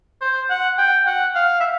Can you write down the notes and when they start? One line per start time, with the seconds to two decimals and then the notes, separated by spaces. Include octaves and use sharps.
0.21 C5
0.50 F#5
0.78 G5
1.06 F#5
1.35 F5
1.60 E5